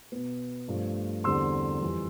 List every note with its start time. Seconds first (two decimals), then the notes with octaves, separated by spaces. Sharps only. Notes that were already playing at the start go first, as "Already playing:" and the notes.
0.12 B2 B3
0.69 G2 F3 A3
1.24 E2 D3 G3 C4 C6 E6
1.81 F2 E3 G3